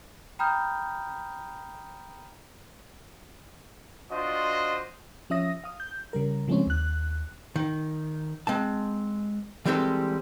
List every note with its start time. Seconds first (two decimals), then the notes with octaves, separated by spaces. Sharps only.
0.39 G5 A#5 B5 D#6 F6 G6
4.11 D4 F4 F#4 C5 D#5
5.30 F3 C#4 E5 D#6 A#6
5.64 F5 D#6
5.80 G6
6.13 C#3 G3 A#4
6.48 C#3 F3 G#3 A3 C4 C#4
6.67 D#2 F#6
7.56 D#3
8.47 G#3 C4 A5
9.65 E3 G3 G#3 C4 G4 A4